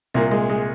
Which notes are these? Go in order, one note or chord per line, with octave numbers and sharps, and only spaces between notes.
C2 A#2 A#3
G#3
G#3